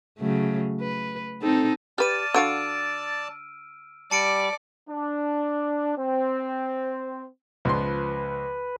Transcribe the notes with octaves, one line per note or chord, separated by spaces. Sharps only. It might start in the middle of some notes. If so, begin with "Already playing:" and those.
C#3 F#3 A3
B4
C4 D#4 A4
G4 B4 D5 A5 F6 D#7
D3 F#4 F5 E6 D7
G3 D5 A5 C#7 D7
D4
C4
C#2 F3 B4 C6